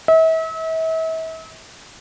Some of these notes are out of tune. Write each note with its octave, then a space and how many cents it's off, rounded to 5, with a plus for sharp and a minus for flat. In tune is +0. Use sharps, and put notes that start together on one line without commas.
E5 -40